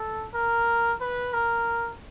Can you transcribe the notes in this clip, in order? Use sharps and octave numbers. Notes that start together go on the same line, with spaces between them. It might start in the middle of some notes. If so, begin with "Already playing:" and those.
Already playing: A4
A#4
B4
A#4